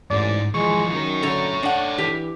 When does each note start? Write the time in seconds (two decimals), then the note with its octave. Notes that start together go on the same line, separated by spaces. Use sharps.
0.11 A1 G#2 D5
0.55 E3 F3 G#3 C#6
0.93 F#2 D#4 A#4
1.23 D3 A4 C#5 A#5
1.63 D4 F#5
1.98 E3 G4